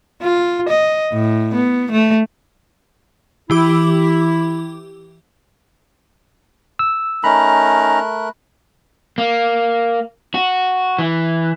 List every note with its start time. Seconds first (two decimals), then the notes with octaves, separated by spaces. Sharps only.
0.22 F4
0.69 D#5
1.13 A2
1.55 B3
1.92 A3
3.50 E3 E4 G4 D6
6.79 E6
7.24 A3 C#4 D#4 A#4 A#5 B5 F#6
9.18 A#3
10.34 F#4
10.99 E3